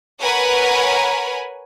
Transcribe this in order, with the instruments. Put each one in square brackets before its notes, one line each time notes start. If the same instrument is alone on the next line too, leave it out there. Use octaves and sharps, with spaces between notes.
[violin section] A#4 B4 C#5 F#5 G#5 B5